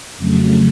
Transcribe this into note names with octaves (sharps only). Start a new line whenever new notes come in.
F2 C#3 F#3 A3